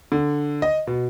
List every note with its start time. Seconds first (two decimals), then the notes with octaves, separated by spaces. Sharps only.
0.12 D3
0.62 D#5
0.87 B2